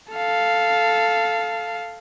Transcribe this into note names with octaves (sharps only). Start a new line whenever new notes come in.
A4 F5